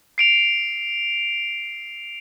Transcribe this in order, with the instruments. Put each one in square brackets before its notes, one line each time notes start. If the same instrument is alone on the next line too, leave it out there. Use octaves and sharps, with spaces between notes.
[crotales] C7 D7 F7